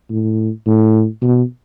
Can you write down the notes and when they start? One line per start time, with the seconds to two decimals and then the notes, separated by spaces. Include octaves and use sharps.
0.10 A2
0.67 A2
1.23 B2